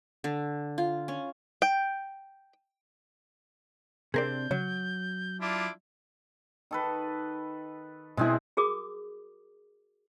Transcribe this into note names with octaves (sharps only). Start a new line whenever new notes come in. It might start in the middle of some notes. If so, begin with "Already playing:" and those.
D3
F4
C#4
G5
C3 C4 D4 G#4 A#4 D5 G6
C#3 F#3
D4 E4 F4 D6
D#3 A4 B4
B2 G#3 C4 E4 G#4
F#4 G#4 A#4 D6 D#6